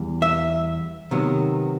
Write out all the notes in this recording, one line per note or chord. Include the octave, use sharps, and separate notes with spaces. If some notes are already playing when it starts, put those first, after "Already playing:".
Already playing: E2 G3
E5
C3 D#3 F#3 B3